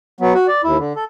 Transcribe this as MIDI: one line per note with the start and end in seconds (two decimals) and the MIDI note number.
0.20 0.34 54
0.20 0.34 59
0.34 0.47 66
0.48 0.62 74
0.64 0.77 39
0.64 0.77 64
0.78 0.93 50
0.96 1.04 69